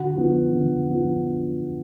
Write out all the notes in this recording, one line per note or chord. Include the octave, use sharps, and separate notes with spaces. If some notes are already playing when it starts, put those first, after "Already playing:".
Already playing: D3 F#4 F#5
F3 B3 D4
D3
F3 B3 D4